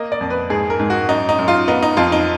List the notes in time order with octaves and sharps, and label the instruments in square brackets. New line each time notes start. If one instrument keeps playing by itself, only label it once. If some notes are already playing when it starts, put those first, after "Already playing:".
Already playing: [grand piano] A#3 D#5
D5
F2
B4
G#2 G#4
A#4
G#2
F#4
F#2 D#4
D#4
F#2
F4
B3 D#4
D#4
F2 F4
D#4